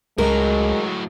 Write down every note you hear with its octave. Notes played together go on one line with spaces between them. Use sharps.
C#2 A2 F#3 G#3 A#4